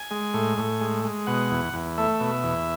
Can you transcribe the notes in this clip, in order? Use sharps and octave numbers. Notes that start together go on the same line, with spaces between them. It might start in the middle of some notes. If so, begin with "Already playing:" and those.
Already playing: G#5
G#3
A2
A2
G#3
G#3
B2 F#5
E2
E2
A3 E5
B2
E2